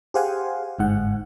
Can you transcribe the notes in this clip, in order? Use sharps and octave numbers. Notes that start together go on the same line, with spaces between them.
G4 G#4 C5 F5 F#5 G#5
G1 G#2 F#5